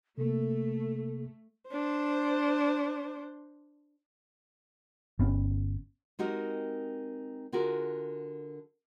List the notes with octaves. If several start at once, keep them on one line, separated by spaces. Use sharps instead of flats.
C3 A3 A#3 A4
D4 C5
G1 B3 C#4
G#3 C4 D#4 F#4 G4 A#4
D3 F4 F#4 G#4 A#4